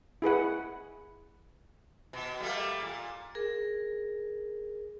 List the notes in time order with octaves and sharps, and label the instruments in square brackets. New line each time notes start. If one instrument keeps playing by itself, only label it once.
[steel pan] E4 G#4 B4 F#5
[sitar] B2
G3 A3 A#3
A#2
[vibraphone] G#4 A#4